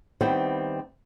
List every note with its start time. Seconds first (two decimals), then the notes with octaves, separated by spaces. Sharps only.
0.21 D#3 G3 B3 C4 E4 C5